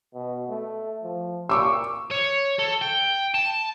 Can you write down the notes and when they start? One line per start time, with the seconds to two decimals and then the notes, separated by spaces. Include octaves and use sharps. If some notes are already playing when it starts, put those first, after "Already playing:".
0.14 B2
0.49 A3
1.03 F3
1.49 A#2 C#6 D6 E6
2.11 C#5
2.59 A4
2.81 G5
3.34 A5